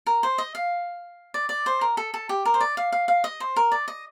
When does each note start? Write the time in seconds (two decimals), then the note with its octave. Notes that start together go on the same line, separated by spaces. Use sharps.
0.07 A#4
0.23 C5
0.38 D#5
0.55 F5
1.34 D5
1.49 D5
1.66 C5
1.81 A#4
1.97 A4
2.14 A4
2.29 G4
2.45 A#4
2.54 C5
2.61 D5
2.77 F5
2.92 F5
3.08 F5
3.24 D#5
3.40 C5
3.56 A#4
3.72 D5
3.88 D#5